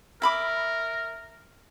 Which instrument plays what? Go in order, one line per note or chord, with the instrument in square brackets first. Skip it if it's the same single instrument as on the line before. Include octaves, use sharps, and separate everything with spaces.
[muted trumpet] A#4 [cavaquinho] E5 B5 D6